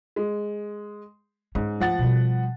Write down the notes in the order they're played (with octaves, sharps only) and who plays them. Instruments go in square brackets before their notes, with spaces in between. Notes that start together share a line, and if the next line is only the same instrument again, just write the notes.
[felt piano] G#3
[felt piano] G#2 [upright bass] C#4
[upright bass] D2 [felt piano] F3 F#5 A6
[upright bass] B2 G3